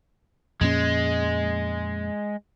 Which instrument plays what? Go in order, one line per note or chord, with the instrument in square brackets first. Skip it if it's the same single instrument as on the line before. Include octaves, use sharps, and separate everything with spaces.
[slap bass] F2 A#2 C#4 [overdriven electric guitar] G#3